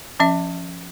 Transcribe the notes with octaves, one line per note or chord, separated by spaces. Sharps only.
F3 C#4 E5